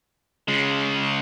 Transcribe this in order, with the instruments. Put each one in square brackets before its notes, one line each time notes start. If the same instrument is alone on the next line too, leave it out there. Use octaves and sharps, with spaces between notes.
[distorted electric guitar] C#3 G#3